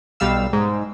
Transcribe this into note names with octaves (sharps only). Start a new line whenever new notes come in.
B1 G3 F5 E6
G#2